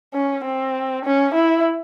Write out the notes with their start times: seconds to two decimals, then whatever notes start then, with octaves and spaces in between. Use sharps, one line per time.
0.14 C#4
0.44 C4
1.05 C#4
1.35 E4